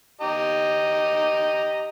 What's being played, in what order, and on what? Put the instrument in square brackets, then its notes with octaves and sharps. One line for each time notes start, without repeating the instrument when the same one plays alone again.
[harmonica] G4 D#5 A#5